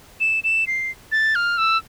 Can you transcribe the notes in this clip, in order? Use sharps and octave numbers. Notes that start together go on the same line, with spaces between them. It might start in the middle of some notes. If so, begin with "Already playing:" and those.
E7
E7
C7
A6
F6
E6